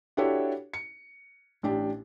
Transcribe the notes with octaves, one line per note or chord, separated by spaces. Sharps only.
D4 E4 F#4 G4 A4 C#5
C#7
A1 D4 G4